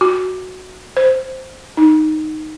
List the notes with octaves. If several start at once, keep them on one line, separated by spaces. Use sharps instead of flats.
F#4
C5
D#4